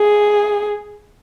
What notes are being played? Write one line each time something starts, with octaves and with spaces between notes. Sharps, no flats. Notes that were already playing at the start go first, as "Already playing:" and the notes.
Already playing: G#4